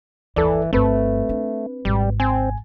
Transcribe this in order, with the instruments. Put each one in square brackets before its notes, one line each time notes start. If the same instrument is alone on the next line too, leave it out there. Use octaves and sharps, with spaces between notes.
[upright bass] G1 D#2 [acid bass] E3 [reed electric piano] A4 D5
[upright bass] G1 G2 [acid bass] A3 [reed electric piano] C4 B4
[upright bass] D4
[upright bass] G#1 C3 [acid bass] G3
[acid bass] C4 [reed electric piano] G#5